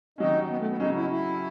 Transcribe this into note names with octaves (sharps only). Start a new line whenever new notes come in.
D#3 F#3 C#4 D#4
B3
A3
B3
C#3 F#3 C#4 D#4
E4
E4